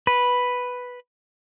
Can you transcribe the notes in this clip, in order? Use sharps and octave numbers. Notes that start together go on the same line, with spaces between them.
B4